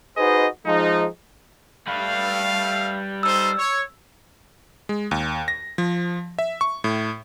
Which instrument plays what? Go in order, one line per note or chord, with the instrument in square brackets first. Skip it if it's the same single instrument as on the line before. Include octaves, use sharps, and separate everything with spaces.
[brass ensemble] D#4 F#4 G#4 B4 C5 D#5
F3 G#3 D#4
[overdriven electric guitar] G3 B4 [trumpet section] A3 F5
[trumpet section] D#4 A4 C5 [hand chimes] E6
[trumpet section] C#5
[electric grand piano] G#3
D#2
A#6
F3
E5
C#6
A2